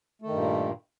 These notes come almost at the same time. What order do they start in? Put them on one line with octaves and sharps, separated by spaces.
A3 D#3 G2 A#2